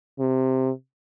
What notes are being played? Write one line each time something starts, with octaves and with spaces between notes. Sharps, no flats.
C3